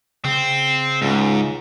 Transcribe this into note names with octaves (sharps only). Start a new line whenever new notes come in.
C#3 C4
C#2 G#2